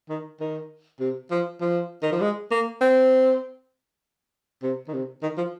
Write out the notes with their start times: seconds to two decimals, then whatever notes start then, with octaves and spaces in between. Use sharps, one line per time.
0.09 D#3
0.40 D#3
1.00 C3
1.31 F3
1.61 F3
2.02 D#3
2.12 F3
2.20 G#3
2.51 A#3
2.81 C4
4.63 C3
4.88 D#3
4.93 C3
5.22 D#3
5.37 F3